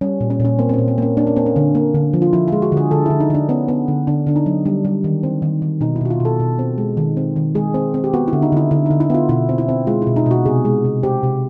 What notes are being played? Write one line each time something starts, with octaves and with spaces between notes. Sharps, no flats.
G3 C#4
A#2
C#4
A#2
C#4
A#3 C4
C4
A#2 C#4
C4
A#3 C#4
A#3 D4
C#4
A#3 C4
C#4
D3
A#3
D3
F3
F4
F3 E4
G#3 F4
F#4
D3
G#4
D3 A4
D3 E4
D#4
D3 D4
B3 C#4
B3
D3
D3 D4
D3 D4
D#4
F#3
G3 D4
G3
D#3
C4
D#3
D#3
B2 D#4
E4
B2 F#4
F4
B2
A4
B2
C4
G#3
D#3
C4
D#3
G#3 G#4
C4
C4
G4
B3 F#4
E4
D3
D#4
D3 E4
D3 E4
D3 D#4
E4
B3 F4
B2 E4
C4
E4
C4
G#3 F4
B2 E4
D#4
B2 F#4
C3 G#4
G#3
C3
C4 G4
C3